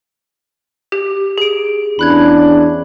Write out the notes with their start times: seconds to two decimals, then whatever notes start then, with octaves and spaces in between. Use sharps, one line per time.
0.92 G4
1.38 G#4 D7
1.99 E2 C#4 D4 B5 F#6 G#6